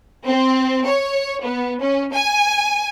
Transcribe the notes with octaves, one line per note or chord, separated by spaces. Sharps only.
C4
C#5
B3
C#4
G#5